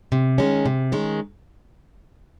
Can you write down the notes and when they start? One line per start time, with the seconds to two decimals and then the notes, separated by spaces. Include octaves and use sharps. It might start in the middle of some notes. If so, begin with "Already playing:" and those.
0.12 C3
0.38 D#3 G#3 C#4
0.66 C3
0.92 D#3 G#3 C#4